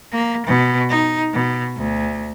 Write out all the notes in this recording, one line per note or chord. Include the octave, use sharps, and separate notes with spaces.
A#3
B2
D#4
B2
D2